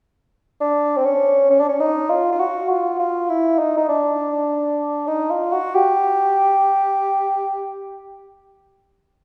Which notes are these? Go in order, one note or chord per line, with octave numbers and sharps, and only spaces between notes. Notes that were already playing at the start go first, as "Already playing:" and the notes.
D4
C4
C#4
C#4
D4
C#4
D#4
F4
F4
F#4
F4
F4
E4
D#4
D#4
D4
D#4
F4
F#4
G4